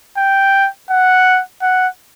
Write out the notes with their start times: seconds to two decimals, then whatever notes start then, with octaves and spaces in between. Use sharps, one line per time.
0.17 G5
0.90 F#5
1.62 F#5